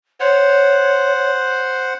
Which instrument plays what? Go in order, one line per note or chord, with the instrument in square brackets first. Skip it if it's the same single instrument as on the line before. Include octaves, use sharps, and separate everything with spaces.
[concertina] C5 F#5 [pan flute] C#5